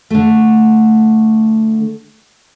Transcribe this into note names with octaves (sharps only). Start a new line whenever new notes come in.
D3 A3